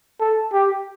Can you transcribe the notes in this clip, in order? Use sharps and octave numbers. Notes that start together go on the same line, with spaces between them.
A4
G4